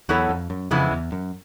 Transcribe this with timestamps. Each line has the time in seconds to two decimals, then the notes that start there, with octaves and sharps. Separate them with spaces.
0.09 E2 F#3 B3 E4 A4 C#5
0.29 F2
0.50 F#2
0.71 F2 C#3 E3 G#3 B3 E4
0.91 E2
1.12 F#2